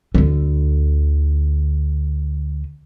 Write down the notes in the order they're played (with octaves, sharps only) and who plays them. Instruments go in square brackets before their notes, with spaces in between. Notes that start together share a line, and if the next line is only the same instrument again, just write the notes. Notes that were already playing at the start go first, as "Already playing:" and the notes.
[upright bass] D2 D3